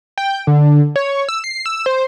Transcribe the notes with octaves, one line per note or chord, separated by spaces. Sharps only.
G5
D3
C#5
E6
C7
E6
C5